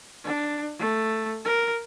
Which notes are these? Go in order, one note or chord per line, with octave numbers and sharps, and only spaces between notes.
D4
A3
A#4